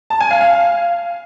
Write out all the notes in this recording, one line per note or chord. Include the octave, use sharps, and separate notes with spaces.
A5
G#5
F5
F5